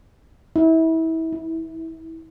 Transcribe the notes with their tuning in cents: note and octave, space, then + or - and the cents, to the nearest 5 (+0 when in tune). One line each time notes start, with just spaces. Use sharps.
E4 -30
E4 -10